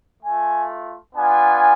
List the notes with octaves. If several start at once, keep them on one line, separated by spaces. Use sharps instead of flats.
A3 F4 G#5
B3 D4 F4 G#5